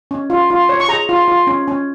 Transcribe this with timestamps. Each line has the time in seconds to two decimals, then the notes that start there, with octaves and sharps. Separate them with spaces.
0.11 C#4
0.30 F4
0.50 F4
0.69 C#5
0.80 C#6
0.88 G#4 A#5
1.09 F4
1.28 F4
1.47 C#4
1.68 C#4